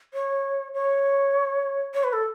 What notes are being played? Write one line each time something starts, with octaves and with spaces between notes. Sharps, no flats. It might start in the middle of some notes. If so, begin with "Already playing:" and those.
C#5
C#5
C#5
B4
A4